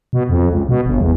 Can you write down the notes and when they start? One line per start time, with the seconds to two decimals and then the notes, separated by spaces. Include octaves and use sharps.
0.13 B2
0.29 F2
0.50 C#2
0.69 B2
0.86 G1
1.00 E2